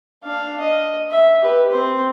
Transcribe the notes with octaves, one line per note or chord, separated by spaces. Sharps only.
D4 F5
D#5
E5
G4 B4
C4 C5